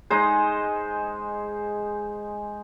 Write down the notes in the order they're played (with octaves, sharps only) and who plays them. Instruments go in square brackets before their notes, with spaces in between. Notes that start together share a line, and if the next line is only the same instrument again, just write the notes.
[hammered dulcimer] G#3 D#4 G#4 C5